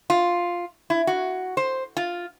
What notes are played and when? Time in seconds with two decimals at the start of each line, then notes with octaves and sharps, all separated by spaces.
0.10 F4
0.90 E4
1.07 F#4
1.57 C5
1.97 F4